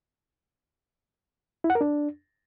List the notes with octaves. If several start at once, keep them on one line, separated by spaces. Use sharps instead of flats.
E4
F#5
A#4
D4